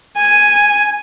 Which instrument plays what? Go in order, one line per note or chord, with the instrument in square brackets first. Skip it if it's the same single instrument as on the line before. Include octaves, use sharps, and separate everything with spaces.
[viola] G#5